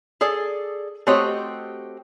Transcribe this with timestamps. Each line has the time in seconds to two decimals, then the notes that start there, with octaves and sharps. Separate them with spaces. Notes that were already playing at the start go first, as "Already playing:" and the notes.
0.21 G#4 A4 D5
1.07 A3 C4 F#4 G4 C#5 D#5